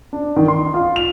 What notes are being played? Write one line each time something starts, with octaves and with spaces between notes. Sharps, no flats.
D4
D#3
C6
F4
F7